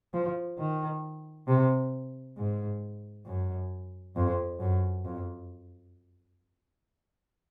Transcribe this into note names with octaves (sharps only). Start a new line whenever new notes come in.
F3
D#3
C3
G#2
F#2
F2
F#2
F2